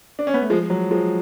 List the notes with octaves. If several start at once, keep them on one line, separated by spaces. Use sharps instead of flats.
D4
C#4
B3
A3
F3 G#3
F#3
F3 G#3